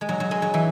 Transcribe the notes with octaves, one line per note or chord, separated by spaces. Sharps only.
G#3
F#3
F#3
G#3
F#3
E3